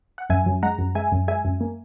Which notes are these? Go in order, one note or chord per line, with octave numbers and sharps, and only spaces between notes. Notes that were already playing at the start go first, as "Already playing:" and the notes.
F#5
F#2 E5 G#5
F#2
G#3 F#5 A#5
F#2
G#3 E5 G#5
F#2
G#3 E5 G#5
F#2
A#3